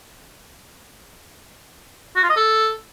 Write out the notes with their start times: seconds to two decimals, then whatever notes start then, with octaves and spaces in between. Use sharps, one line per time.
2.16 F#4
2.23 F4
2.30 D#5
2.37 A4